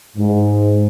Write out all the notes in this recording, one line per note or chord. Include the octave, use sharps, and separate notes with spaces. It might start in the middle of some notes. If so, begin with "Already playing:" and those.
G#2